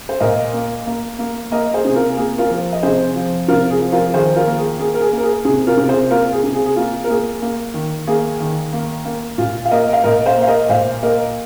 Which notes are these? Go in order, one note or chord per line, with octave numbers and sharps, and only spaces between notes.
C5
A#2 A#4 D#5
A#3
A#3
A#3
A#3 A#4 D#5
G#4 C5
C3 G#4
F4 A#4
A#3 G#4
F4 A#4
F3
D#5
C3 G#4 C5
F3
C3 F4 A#4
G#4
F3
F4 A#4
D#3 G#4 C5
F4 A#4
A#3
G#4
A#3 G#4
A#4
G#4
A#3
A#4
G#4
C3 G#4
F4 A#4
C3
G#4 C5
A#3 F4 A#4
G#4
C3
G#4
G#4
A#3 F4
A#4
A#3 G#4
A#3
D#3
A#3 G#4
D#3
A#3
A#3
A#2 F4
F5
A#3 A#4 D#5
F5
A#2 A#4 D#5
C5 F5
A#3
F5
A#4 D#5
A#2 C5 F5
A#3 A#4 D#5